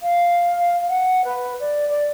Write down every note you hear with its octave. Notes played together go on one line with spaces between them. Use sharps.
F5
F#5
B4
D5
D5